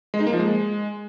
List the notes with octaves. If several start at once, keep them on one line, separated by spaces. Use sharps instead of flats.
G#3
D#4
A#3
F3
G#3